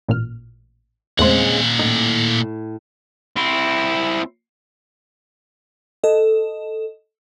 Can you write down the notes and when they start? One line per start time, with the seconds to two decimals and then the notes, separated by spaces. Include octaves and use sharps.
0.08 A1 A#2 F6
1.19 E2 A#2 C#3 G#3 A3 C4 F#5 C6
1.79 A2 D#4
3.36 C4 E4
6.04 A4 D#5